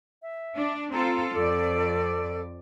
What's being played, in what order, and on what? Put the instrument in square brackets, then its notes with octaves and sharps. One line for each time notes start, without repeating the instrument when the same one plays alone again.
[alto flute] E5
[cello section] D4
[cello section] C4 F4 A4 [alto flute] A#5
[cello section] F2 D5 [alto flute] A4